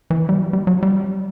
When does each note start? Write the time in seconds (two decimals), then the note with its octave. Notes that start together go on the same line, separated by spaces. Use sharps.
0.10 E3
0.29 G3
0.38 F#3
0.53 G3
0.67 F#3
0.83 G3